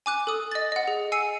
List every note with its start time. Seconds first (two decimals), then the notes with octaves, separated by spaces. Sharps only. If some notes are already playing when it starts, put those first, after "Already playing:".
0.06 G#5 D6 F#6
0.27 A4 D#6
0.52 D#5 A6
0.72 D#5 F#5
0.88 G#4
1.12 G#5 E6 C7 C#7 D#7